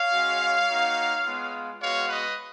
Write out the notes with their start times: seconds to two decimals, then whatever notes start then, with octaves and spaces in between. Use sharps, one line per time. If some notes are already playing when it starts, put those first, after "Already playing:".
Already playing: C#5 F5
0.11 G#3 C#4 F#4
0.67 A#3 D#4 F#4
1.25 G#3 B3 F4
1.80 G#3 B3 F#4 C#5 F5
2.09 B4 D#5